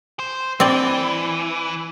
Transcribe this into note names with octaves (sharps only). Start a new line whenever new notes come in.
C5
E3 C4 D5